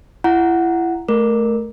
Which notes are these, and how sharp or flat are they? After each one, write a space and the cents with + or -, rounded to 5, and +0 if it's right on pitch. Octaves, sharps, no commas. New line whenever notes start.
E4 +30 F#5 +0 A#5 +0
A3 -15 A#4 +5